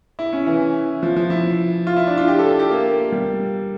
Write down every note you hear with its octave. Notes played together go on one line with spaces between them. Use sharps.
E4
C#4
E3
F3
F3
E4
F4
E4
D4
F4
G4
A4
A4
G4
A#3
A#3
G3